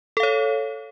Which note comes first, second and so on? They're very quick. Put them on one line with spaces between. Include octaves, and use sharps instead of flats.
A4 F5 C#5